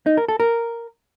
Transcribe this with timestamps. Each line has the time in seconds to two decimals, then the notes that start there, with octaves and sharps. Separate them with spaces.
0.06 D#4
0.17 A#4
0.28 A4
0.40 A#4